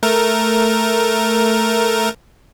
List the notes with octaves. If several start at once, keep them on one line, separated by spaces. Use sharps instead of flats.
A3 A#4